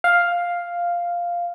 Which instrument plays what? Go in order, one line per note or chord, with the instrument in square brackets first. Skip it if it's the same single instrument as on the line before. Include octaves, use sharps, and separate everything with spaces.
[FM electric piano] F5